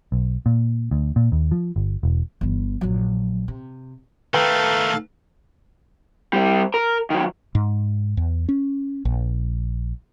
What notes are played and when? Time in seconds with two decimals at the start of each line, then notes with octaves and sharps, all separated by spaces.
0.12 B1
0.46 A#2
0.91 D2
1.16 A#2
1.32 D#2
1.51 F3
1.76 G1
2.03 E1
2.41 G1 E3
2.81 A#1 F#3
3.48 C3
4.34 D#3 A3 A4 B4 F5 G5 A#5
6.33 G3 C4
6.74 A#4
7.10 D#3 F#3
7.55 G#2
8.17 E2
8.49 C#4
9.05 A#1